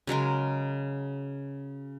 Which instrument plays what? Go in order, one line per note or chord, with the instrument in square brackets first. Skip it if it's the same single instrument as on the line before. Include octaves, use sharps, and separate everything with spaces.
[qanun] C#3 F#3 G#3 A#4